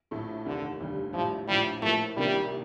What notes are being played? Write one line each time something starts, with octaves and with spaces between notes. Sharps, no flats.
A#1 A2 A3
F1 D#2 D3 D#3
F1 D#2 D3 G3
A#1 A2 F3 G3
A#1 A2 F3 G3
A2 F3 A3 A#3
C2 C3 D#3 G3 A#3 D4